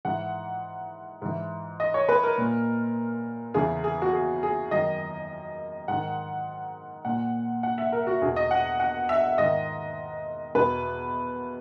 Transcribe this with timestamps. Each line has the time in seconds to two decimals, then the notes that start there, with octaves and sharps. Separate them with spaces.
0.05 G#2 E3 F#5
1.22 G#2 E3
1.80 D#5
1.94 C#5
2.09 B4
2.23 A#4
2.38 A#2
3.54 E2 C#3 E3 G#4
3.84 G#4
4.02 F#4
4.13 G#4
4.43 G#4
4.71 F#2 D#3 D#5
5.88 G#2 D#3 F#5
7.05 A#2 F#5
7.63 F#5
7.78 E5
7.92 A#4
8.07 F#4
8.22 E2 B2 G#4
8.36 D#5
8.51 F#5
8.80 F#5
9.09 E5
9.38 G#2 D#3 D#5
10.55 E2 B2 B4